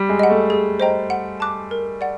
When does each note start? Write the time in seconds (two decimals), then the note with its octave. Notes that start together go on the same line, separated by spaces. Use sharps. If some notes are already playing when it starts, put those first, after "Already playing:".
Already playing: G3
0.09 G#3
0.19 D#5 F#5
0.30 A3
0.50 G#4
0.80 C5 D#5 G5 A#5
1.10 F#5
1.40 A5 D6 F#6
1.71 A#4
2.01 D5 F#5